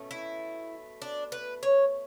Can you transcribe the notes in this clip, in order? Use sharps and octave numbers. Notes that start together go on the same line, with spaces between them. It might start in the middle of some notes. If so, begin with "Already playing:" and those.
Already playing: B2 A3 C#4
E4
D4
B4
C#5